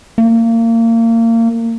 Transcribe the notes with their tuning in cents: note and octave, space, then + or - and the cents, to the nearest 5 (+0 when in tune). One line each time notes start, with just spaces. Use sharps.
A#3 -30